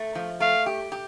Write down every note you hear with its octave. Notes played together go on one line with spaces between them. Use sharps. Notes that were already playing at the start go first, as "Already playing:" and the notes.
Already playing: A3
F3
A3 F5
G4
G4